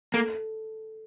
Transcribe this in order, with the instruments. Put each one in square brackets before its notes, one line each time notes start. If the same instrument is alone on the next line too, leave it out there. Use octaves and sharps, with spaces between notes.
[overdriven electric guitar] A#3 [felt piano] A4